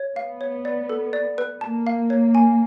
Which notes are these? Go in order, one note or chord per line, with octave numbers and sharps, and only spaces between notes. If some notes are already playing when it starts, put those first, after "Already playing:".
Already playing: C#5
B3 F5
C#5
D5
A4
D5
B4
A#3 A5
F5
C#5
G#5